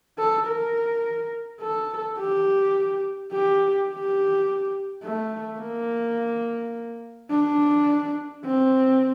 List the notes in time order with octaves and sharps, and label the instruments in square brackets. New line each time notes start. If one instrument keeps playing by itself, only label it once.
[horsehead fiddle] A4
A#4
A4
G4
G4
G4
A3
A#3
D4
C4